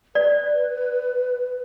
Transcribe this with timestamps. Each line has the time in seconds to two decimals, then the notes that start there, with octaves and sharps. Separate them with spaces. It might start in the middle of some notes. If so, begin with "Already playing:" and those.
0.15 B4 D5